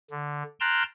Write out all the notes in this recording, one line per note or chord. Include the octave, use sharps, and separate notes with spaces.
D3
G5 A5 A#5 C6 F6 F#6